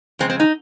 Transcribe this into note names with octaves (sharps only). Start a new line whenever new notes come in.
F2 C#3 G#3 C4
C4
D#4